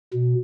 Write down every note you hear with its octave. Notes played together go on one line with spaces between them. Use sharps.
B2